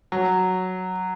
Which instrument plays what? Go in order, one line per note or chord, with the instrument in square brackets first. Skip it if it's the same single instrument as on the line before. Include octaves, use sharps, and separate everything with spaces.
[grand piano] F#3